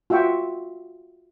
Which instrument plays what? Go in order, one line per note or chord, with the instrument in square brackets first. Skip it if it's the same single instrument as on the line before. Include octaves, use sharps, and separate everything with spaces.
[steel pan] F4 F#4 E5 G5 C#6